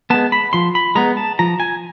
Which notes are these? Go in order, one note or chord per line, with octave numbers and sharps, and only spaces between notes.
G#3 B3 A5
B5
F3 C6
B5
G#3 B3 A#5
A5
F3 A#5
G#5